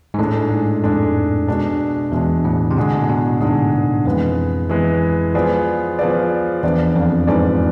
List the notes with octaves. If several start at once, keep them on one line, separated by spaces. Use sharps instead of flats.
G#2
A2 G#3 D4 A4
G#2
F2 G#3 D4 A4
B2 G#3 D4
E2 B2 G#3 D4
A2
C3
B2 D3 G#3 D4 G#4
A2
B2
G#2 D3 G#3 D4 G#4
F2 E3 G#3 B3
E3 G#3 B3
F3 B3 F4 G#4 D5
F3 B3 F4 G#4 D5
E2 F3 B3 D4 G#4 D5
F2
G#2 F3 B3 D4 G#4 D5